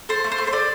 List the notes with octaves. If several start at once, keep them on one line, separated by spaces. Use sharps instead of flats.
A4 C5
A3
C5
A3
C5
A4 D5